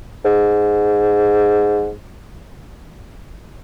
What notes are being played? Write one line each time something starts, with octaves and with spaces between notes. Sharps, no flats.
G#2